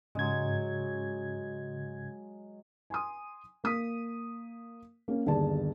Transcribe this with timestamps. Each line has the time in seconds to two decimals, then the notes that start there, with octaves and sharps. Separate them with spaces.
0.15 G#2 C#3 F#3 G#3 G#6
2.90 G#5 C6 D#6
3.64 A#3 D#6 B6
5.08 A#3 C#4
5.26 G1 D#2 G#4 D5 A5